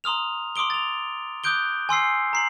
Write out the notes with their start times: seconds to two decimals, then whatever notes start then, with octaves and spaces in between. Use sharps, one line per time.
0.04 A#5 C6 D#6 F6 F7
0.56 C6 D6 D#6 D7 G7
0.70 A6 F7
1.44 D6 D#6 F#6 G6 D7 G7
1.89 G#5 C6 E6 C7
2.33 A#5 C7 F#7